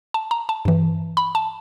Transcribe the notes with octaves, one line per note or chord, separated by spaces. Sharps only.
A5
A#5
A5
G2 E3
B5
A5